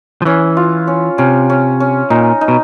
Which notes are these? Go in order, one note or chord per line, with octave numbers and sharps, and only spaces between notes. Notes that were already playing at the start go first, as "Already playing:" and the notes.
F3
E3 C#4
F4
C#4
C3 C#4
C#4
C#4
A#2 D#4
D#4
B2